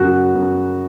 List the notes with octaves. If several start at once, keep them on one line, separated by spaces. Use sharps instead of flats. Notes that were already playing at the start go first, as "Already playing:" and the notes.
Already playing: F#2 C#3 F#4
F#2